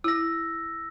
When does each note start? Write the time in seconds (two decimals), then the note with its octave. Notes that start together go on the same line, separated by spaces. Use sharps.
0.04 E4 E6 A#6